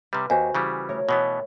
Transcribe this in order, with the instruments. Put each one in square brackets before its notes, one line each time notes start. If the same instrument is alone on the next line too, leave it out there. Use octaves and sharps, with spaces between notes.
[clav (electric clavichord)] C3 G3 [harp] B4 F6
[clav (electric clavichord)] D#2 [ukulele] F#4 C5 G#5
[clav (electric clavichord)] C#3 E3 G3
[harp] A3 A#4 C#5
[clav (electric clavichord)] B2 E3 B3